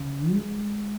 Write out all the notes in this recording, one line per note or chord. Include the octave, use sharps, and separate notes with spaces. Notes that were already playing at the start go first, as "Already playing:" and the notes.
Already playing: C#3
G#3